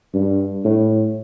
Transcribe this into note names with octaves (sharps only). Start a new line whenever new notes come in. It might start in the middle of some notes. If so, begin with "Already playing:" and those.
G2
A2